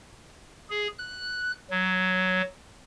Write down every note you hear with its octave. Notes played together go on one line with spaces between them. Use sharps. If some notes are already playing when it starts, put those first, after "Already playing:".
G#4
F#6
F#3